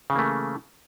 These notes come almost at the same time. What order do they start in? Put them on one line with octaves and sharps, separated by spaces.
C#3 E3 A#3 A3